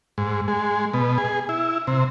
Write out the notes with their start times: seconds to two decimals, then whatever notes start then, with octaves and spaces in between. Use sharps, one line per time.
0.18 G#2
0.48 G#3
0.93 B2
1.18 G#4
1.49 E4
1.87 C3